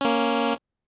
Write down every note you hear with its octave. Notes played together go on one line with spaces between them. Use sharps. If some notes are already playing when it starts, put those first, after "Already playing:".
A#3 C#4